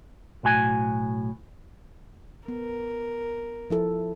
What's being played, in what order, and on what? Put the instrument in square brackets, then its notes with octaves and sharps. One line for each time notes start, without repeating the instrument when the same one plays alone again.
[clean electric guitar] B1 A2 F#4 G#5
[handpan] B3 [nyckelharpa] A#4
[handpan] F3 E4 A4